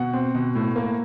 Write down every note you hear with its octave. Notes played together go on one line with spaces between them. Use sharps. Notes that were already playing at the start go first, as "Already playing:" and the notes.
Already playing: B2 F#5
C4
B2
A2
A#3